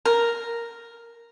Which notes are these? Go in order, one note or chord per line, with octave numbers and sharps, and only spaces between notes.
A#4